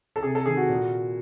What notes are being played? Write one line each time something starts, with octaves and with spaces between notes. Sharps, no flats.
A4
C3 G#4
A4
D#3 G#4
F#4
A#2